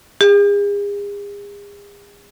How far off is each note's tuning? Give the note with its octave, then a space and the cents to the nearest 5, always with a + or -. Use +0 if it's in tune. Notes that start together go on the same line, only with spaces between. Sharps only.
G#4 -40